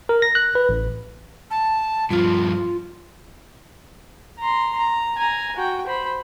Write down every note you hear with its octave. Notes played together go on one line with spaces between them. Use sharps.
A#4
A#6
F#6
B4
A1
A5
G2 F3 F4
A#5 C6
A#5
G#5 A#5
F#4 G5
C5 B5